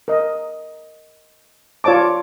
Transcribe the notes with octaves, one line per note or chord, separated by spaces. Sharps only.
A#4 D#5
F4 C#5 D5 A5 D6